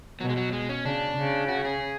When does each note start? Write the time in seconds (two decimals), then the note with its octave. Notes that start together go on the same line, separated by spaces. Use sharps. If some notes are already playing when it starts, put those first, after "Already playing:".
0.21 B2 F#3
0.30 G#3
0.37 F#3
0.53 G#3
0.69 C#4
0.84 C#3 D4
1.17 C#3
1.49 F#4
1.65 G#4